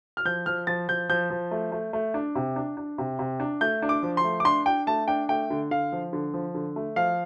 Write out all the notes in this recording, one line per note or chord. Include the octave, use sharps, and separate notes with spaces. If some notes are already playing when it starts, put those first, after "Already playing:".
F6
F3 G6
F3 F6
F3 A6
F3 G6
F3 G6
F3
A3
A3
A3
D4
C3
D4
D4
C3
C3
D4
A3 G6
D4
D6
F3
C6
A3
D6
D4 C6
D4 G5
A3 A5
D4 G5
A3 G5
D3
D3 F5
F3
D3
F3
D3
A3
F3 F5